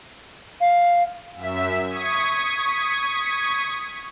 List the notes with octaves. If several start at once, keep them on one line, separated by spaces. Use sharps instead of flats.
F5
F#2 E5 B6
C#6 D#6 G#6 B6